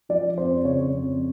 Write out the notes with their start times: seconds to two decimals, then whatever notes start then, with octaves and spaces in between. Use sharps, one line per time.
0.09 F3 D5
0.37 F2 C5
0.64 C#3 C#5
0.91 F2